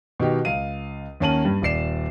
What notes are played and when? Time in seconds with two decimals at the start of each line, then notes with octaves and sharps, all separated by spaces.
0.20 B2 D#3 G4
0.45 C#2 F5 D#7
1.20 D#2 A#3 C#4 A5 D#7 F#7
1.45 G2
1.62 D#1 D5 C7 E7